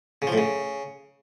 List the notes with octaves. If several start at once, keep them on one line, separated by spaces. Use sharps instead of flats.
C#3
F3
A2
C#3